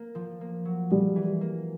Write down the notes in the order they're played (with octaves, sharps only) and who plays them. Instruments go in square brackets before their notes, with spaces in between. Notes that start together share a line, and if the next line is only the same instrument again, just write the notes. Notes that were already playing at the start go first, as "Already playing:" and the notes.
Already playing: [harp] A#3
F3
A#3
F#3
[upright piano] G3 [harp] G#3
[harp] E3
A#3